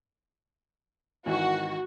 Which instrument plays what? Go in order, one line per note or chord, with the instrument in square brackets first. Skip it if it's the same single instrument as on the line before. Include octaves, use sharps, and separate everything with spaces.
[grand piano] G#1 D#3 E3 [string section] F#4